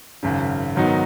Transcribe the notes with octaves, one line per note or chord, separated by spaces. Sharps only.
G#1 F#2 C#3
G#2 D#3 F#3 B3 D#4